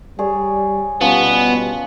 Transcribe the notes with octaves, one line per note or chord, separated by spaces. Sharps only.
G3 G#4 C#5 D5
B2 F3 G3 B3 C#4